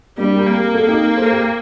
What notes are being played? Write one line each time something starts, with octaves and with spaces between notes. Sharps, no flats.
G3 A#3 D4
G4 A#4
A#3
G4 A#4
F#4 A4
D#4 G4
A4 C5
G4 A#4